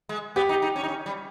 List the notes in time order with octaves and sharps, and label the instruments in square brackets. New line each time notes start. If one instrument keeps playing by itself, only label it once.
[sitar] G#3
[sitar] B3 [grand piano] G4
[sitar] D#4
D#4
C#4
D#4
C#4
G3